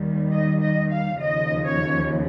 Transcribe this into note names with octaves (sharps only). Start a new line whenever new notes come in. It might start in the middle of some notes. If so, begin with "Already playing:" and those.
Already playing: D#2 D#3 G3
D#5
D#5
F5
D#2 C#3 F3 D#5
C#5